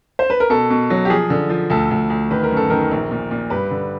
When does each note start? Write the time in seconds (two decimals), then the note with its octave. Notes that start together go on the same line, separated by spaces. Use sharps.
0.19 C5
0.30 B4
0.40 A#4
0.50 B2 A4
0.70 B2
0.90 F#3
1.05 G4
1.10 F3 G#4
1.30 D3
1.50 F3
1.70 D2 A4
1.91 D2
2.10 D2
2.31 D#3 B4
2.43 A#4
2.51 F#2
2.57 A4
2.70 D#3 A#4
2.91 A#1
3.11 A#2
3.31 A#2
3.50 G2 B4
3.71 D3